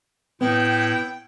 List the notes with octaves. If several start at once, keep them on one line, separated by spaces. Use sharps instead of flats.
A2 B3 E4 G5